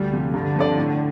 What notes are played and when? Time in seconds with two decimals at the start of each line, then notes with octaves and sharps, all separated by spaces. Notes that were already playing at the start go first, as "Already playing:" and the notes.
Already playing: D2 G3
0.12 C3 F3
0.34 G2 D3
0.56 F3 C4 A4 D5
0.78 A2